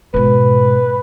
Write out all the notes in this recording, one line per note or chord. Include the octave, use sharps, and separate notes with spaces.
G#2 B2 B4